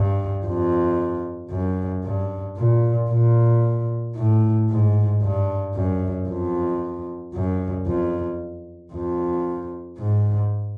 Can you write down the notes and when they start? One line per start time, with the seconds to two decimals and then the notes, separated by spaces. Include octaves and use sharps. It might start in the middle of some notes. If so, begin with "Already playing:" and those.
Already playing: G2
0.46 F2
1.50 F#2
2.04 G2
2.57 A#2
3.10 A#2
4.16 A2
4.70 G#2
5.22 G2
5.75 F#2
6.28 F2
7.34 F#2
7.86 F2
8.93 F2
9.99 G#2